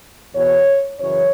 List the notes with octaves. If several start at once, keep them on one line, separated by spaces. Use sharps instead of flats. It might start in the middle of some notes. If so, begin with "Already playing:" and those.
E2 B2 C#5
F#2 C#3 E3 C#5